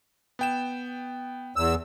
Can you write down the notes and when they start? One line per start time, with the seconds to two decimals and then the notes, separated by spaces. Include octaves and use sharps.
0.39 B3 G5 E7
1.56 E2 E6